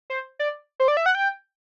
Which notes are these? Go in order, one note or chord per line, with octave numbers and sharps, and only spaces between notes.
C5
D5
C5
D5
E5
F#5
G5